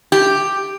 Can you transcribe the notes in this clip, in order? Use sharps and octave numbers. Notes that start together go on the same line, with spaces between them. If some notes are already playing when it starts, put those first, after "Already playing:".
G4